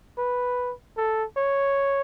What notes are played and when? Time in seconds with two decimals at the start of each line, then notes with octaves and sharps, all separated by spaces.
0.18 B4
0.97 A4
1.37 C#5